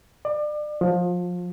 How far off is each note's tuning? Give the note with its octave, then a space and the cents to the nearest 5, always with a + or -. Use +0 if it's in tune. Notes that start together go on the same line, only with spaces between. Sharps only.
D5 +30
F3 +25